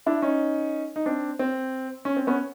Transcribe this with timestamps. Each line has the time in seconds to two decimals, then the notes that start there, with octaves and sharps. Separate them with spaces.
0.06 D4 E4
0.22 C#4 D#4
0.96 D#4
1.06 C4 D4
1.39 C4
2.05 C#4
2.17 C4
2.27 B3 C#4